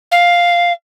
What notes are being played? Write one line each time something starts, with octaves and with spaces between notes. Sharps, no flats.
F5